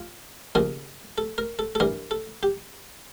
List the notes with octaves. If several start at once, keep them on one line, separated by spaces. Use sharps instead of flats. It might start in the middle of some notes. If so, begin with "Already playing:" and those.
Already playing: F4
D#2 C#3 F3 A#4
A4
A#4
A4
A4
G2 E3 A#4
A4
G4